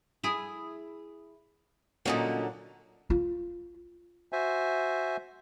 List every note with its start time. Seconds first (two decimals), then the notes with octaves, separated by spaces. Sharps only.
0.24 E4 G#4
2.06 A#2 D3 F#3 A#3 C#4 D#4
3.10 F4
4.32 F#4 C5 E5 G#5